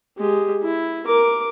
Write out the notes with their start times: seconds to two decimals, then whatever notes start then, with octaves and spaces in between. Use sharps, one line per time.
0.17 G#3 G4
0.63 E4
1.06 A#4 D6